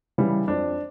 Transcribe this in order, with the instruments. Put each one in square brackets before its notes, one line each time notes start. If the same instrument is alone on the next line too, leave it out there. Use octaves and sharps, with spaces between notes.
[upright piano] C#3 E3 G3
F2 D4